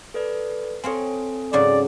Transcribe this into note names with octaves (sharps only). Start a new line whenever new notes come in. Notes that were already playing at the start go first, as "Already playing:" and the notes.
A4 B4 D5
C4 F4 A4 C#5 G#5
G#2 C#3 F#3 D5